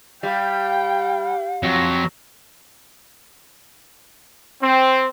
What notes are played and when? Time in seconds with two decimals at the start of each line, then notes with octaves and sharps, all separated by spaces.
0.23 G3 F5 G5
1.63 F2 F#3
4.63 C4